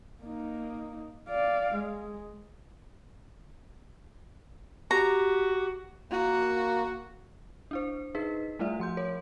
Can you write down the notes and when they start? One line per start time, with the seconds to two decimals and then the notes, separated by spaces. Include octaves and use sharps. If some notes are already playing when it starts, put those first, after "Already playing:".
0.23 A#3 D#4
1.29 D5 F5
1.74 G#3
4.91 F#4 G4 A#5
6.12 A#3 F#4
7.71 D4 E4 C5
8.15 D#4 G#4 B4 D#5 B6
8.59 G3 A3 E4 F4 D5 E5
8.79 F3 C6 G6
8.97 A#4 C#5